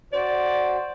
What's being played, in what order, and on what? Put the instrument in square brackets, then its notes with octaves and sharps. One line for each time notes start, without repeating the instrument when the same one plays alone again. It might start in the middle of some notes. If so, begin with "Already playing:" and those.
[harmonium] F#4 C5 [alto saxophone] D5